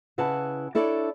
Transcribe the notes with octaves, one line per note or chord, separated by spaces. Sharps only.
C#3 E4 B4 F#5 A5
D4 E4 A4 C#5 D5